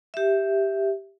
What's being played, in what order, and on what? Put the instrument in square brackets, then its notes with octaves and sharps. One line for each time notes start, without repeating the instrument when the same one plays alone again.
[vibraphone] G4 E5